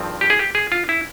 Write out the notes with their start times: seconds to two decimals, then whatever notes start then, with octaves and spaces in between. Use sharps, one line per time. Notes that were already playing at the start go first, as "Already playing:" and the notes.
Already playing: G#1 G2 F3 C4
0.21 G4
0.30 G#4
0.39 G4
0.55 G#4
0.72 F4
0.89 E4